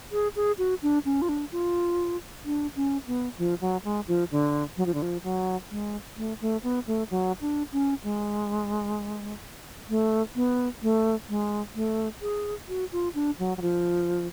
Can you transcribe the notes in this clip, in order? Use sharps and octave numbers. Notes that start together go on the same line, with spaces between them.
G#4
G#4
F#4
D4
C#4
F4
D4
F4
D4
C#4
B3
F3
F#3
G#3
F3
D3
F#3
F3
D3
F3
F#3
G#3
A3
A3
B3
A3
F#3
D4
C#4
G#3
A3
B3
A3
G#3
A3
G#4
F#4
F4
D4
F#3
F#3
F3